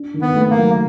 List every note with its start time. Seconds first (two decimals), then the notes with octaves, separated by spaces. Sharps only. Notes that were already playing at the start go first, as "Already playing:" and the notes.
Already playing: D4
0.14 D#3
0.21 B3
0.35 A3
0.50 A#3
0.57 F#3